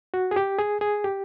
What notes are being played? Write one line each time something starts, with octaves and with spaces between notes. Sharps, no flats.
F#4
G#4
G4
G#4
G#4
G4